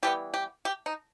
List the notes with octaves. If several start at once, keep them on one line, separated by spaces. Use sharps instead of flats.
E3 G3 B3 G4
G4
G4
D#4